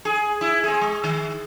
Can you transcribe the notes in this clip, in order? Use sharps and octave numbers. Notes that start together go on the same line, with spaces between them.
G#4
E4
C4 G#4
G#3
D#3